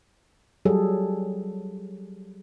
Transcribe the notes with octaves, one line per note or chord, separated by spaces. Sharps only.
F#3 G3 G#4 A4